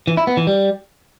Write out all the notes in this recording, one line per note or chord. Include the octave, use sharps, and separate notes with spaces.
E3
E4
B3
E3
G3